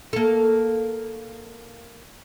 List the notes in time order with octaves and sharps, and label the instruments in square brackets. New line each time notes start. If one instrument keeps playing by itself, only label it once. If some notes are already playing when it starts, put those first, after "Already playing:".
[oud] A#3 A4